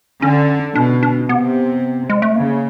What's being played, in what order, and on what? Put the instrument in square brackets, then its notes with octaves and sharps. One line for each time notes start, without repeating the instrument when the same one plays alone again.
[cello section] D3 [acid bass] C#4
[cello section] B2 [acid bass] D4
[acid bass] D4
[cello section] C3 [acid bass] B3
[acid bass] G#3
A3
[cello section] C#3 [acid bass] A#3